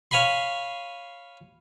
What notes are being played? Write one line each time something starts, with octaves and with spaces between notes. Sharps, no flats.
C#5 F5 G#5 B5 C6